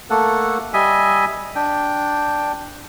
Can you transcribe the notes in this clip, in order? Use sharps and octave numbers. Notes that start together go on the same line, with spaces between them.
A3 A#3 A4 F#5
G3 D#5 E5 G#5
D4 G5